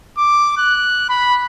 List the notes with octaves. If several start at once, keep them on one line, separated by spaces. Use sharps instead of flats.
D6
F#6
B5